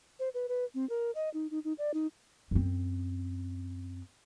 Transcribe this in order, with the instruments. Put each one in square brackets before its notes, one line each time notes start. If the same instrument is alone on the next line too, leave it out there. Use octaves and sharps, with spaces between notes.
[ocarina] C5
B4
B4
C4
A#4
D#5
D#4
D#4
D#4
D5
D#4
[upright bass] F#2 C4